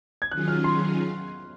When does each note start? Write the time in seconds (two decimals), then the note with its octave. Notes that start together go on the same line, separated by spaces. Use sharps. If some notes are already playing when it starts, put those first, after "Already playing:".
0.22 G#6
0.31 D#3 F#3 C#4 F4 G#4 F#6
0.48 F6
0.64 C6